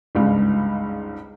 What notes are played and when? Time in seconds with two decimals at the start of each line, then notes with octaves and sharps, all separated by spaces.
0.15 G1 C#2 G#2